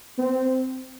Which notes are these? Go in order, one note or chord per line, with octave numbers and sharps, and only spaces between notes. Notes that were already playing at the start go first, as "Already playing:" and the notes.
C4